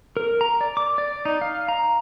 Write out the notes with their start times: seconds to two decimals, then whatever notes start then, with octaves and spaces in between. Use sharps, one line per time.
0.17 A#4
0.41 A#5
0.61 D5
0.77 D6
0.98 D5
1.25 D#4
1.41 F5
1.69 A#5